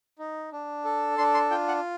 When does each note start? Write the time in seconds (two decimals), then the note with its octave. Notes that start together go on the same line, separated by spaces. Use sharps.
0.19 D#4
0.52 D4
0.85 A4
1.18 D4 C6
1.34 C6
1.51 F4 G5
1.68 F#5